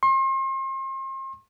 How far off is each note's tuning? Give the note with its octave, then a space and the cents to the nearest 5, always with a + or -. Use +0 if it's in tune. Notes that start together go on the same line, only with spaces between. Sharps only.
C6 +40